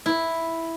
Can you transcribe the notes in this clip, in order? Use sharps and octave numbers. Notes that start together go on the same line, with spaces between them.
E4